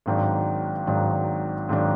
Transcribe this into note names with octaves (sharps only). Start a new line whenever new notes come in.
G#1 G#2 D#3 F#3 D4
G#1 G#2 D#3 F#3 D4
G#1 G#2 D#3 F#3 D4